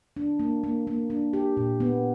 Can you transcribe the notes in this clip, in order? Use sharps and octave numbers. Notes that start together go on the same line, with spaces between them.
D4
A#3
A#3
A#3
D4
G4
A#2
B3